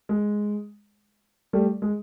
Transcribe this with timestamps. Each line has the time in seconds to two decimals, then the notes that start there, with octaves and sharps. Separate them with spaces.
0.09 G#3
1.53 G3 A3
1.82 G#3